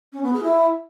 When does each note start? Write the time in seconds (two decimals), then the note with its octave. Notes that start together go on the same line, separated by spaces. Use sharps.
0.12 C#4
0.22 B3
0.32 G#4
0.43 E4